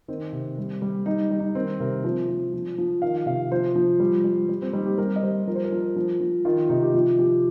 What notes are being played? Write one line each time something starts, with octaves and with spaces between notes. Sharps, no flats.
D#3 C4
C3
G3
G3
G3 D#4
G3
D#4
D#3 C4
C3 A#4
F3 C5
F3
F3
F3
D#3 F5
C3 F5
F3 C5
F3
G3
G3
G3
C4
G3 D#4
G4
G3 A#4
D#5
G3 C5
F3 A#4
C5
A#4
F3
F3
F3
D#3 F4
C3 D#4
G4
F3 F4
F3 G4